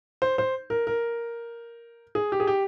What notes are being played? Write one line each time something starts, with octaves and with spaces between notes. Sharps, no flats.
C5
C5
A#4
A#4
G#4
G4
G#4
G4